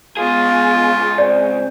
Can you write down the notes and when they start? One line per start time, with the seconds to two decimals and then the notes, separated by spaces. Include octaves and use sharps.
0.17 C#2 B3 F4 G#4 F5
1.18 C4 C5 D5